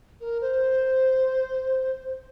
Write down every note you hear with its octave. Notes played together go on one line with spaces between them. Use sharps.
A#4
C5